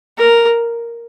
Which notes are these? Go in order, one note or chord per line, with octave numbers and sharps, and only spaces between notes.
A#4